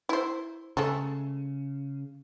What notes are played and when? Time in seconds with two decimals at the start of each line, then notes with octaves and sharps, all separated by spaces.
0.09 E4 C5
0.77 C#3 G#3 A3 A4